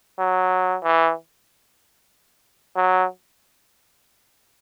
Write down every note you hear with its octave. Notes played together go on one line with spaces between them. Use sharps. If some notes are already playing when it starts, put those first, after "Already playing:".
F#3
E3
F#3